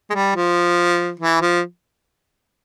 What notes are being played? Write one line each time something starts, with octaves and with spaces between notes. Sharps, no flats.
G#3
G3
F3
E3
F3